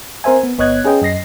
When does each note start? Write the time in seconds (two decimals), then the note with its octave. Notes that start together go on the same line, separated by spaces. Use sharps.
0.24 C4 A#4 C5 E5 G#5
0.43 B3
0.58 G1 B3 C#5 D#5 F#6 G#6
0.85 C#4 G#4 B4 D#5 G5
1.02 F#2 D#5 A#6 C7